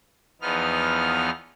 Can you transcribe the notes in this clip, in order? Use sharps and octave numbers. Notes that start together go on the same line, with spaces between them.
E2 F3 B3 D#4 F6